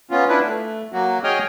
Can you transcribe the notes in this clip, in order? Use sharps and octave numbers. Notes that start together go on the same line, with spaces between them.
B3 C#4 F4
D4 E4 B4
A3
F#3 A#3 F#4
G#4 C#5 D#5 G5 D#6 F6